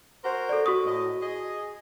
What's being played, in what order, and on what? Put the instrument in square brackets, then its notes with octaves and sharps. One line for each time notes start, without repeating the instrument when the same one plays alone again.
[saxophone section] F#4 A#4 C5
[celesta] A4 D5
F#4 C#6 D#6
[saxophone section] A2 D#5
G#4 D#5